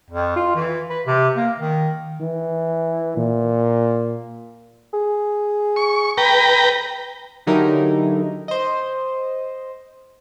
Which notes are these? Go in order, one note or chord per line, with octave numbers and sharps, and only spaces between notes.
F2
F4
E3
B4
C3
A#3
D#3
E3
A#2
G#4
C#6
B4 G5 A#5
D3 F#3 D#4 E4 G4 A#4
C5 D#5